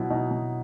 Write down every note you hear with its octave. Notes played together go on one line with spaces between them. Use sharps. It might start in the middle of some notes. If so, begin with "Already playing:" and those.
Already playing: B2 F#3 E4
B2 D#4
B2